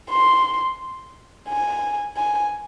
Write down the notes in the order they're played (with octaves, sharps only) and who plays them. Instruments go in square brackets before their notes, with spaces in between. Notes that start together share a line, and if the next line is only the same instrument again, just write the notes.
[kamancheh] C6
G#5
G#5